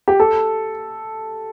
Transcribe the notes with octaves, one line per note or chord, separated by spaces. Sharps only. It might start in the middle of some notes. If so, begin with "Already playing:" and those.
G4
A4